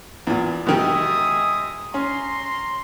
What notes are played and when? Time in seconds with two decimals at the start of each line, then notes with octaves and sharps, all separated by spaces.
0.27 E2 A#2
0.66 B2 D#3 G#3 G4 E5 D#6
1.94 C#4 A#5 C6